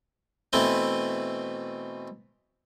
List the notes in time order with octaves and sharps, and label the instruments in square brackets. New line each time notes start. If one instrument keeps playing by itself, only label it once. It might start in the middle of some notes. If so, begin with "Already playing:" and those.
[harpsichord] B2 E3 A3 B3 C4